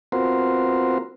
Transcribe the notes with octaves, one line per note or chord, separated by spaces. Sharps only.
B3 C4 F4 F#4 A#4 C5